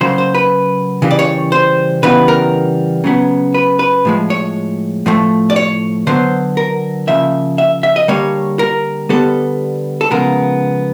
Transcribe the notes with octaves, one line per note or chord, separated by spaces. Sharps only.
C#3 F#3 A#3 C5
C5
B4
C#3 E3 G3 A#3
D5
C#5
C5
C#3 E3 G3 B3 B4
A#4
C#3 F#3 B3
B4
B4
A2 F3 G#3
C#5
A2 F3 A3
D5
C#5
D3 F#3 B3 C5
A#4
C#3 F3 A#3 E5
E5
E5
D#5
D3 G3 A#3 C#5
A#4
D3 G3 B3 A4
A4
C#3 F3 G#3 B3 A#4